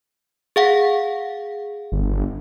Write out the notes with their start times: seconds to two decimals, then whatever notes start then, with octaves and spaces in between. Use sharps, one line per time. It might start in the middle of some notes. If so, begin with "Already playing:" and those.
0.56 G#4 F5 F#5
1.92 G1